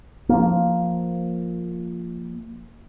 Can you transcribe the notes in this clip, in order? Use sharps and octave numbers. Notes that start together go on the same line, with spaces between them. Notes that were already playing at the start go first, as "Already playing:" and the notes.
F3 A#3